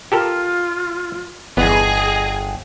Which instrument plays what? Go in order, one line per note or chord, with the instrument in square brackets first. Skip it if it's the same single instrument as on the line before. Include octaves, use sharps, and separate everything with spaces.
[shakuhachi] F4 [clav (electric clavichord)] G4 A4 A#4
[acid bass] G1 [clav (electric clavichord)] E2 B3 [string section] G#4 [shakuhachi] D#5